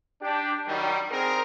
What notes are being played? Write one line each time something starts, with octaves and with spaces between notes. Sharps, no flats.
D4 G4
D#3 F#3 G3
C4 G#4 A#4